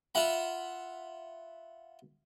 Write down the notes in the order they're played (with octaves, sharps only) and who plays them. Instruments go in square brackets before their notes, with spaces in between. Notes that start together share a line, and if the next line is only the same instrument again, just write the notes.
[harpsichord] F4 E5 F#5 B5